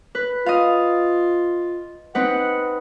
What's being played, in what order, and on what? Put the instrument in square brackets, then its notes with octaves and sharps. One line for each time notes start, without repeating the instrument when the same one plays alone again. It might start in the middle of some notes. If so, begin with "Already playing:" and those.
[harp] B4
[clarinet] F4 [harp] D#5 F5
[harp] C4 D#4 B4 [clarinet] F#5